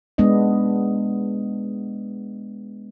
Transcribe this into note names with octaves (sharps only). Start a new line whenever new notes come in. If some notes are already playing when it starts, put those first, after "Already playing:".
G#3 B3 D4 D#5